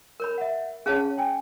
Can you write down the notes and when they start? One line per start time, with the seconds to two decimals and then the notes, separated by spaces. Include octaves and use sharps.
0.20 A#4 C#5 B5
0.38 E5 F#5
0.86 C#4 G#4 C#5 F5 A5
1.18 G5 G#5